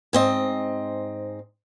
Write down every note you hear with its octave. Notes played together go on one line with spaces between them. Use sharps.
G#2 C4 D#5